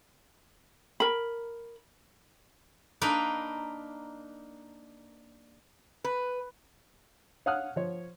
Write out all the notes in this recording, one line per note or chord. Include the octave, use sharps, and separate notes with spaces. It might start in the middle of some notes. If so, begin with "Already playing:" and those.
A#4 B5
A#3 D4 D#4 B4
B4
C#5 F5 F#5 D#6 F6 F#6
F3 C#5